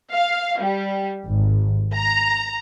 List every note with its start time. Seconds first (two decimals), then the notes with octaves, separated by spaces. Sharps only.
0.13 F5
0.60 G3
1.25 G#1
1.94 A#5